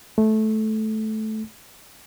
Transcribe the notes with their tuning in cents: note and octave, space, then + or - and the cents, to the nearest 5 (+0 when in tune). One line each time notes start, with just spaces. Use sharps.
A3 -15